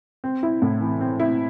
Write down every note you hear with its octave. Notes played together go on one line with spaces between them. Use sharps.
C4
E4
A2
E3
C4
E4